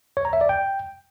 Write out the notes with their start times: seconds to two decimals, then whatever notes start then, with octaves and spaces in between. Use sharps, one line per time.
0.17 C#5
0.25 A#5
0.33 E5
0.41 D5
0.49 G5